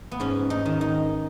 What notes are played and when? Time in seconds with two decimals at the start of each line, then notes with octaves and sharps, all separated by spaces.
0.11 B3
0.20 G#2 C#4
0.50 D#4
0.66 D#3
0.81 D#4